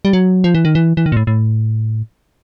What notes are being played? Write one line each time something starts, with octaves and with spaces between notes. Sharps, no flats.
G3
F#3
F3
E3
D#3
E3
E3
D#3
A#2
A2
A2